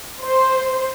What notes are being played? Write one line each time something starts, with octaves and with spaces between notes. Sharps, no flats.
C5